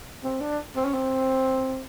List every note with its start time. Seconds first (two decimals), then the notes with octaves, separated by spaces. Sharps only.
0.24 C4
0.41 D4
0.76 C4
0.85 C#4
0.94 C4